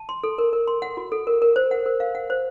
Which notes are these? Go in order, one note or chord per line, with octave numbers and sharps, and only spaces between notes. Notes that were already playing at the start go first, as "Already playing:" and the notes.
Already playing: A5
C6
A4
A#4
A#4
C6
F#5
F#4
A4
A#4
A#4
C5
F#5
A#4
F5
F#5
C5